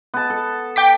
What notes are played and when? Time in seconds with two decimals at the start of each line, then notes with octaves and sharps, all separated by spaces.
0.14 B3 A5
0.30 A4
0.76 G5 D6 B6